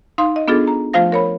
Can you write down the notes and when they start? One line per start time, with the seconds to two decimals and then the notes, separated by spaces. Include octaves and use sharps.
0.18 D#4 F5 C6
0.36 D#5
0.48 B3 D4 F4 G#4 A4
0.67 A#5
0.93 F3 A3 F4 C5 F5 A#6
1.12 A#4 C#5 B5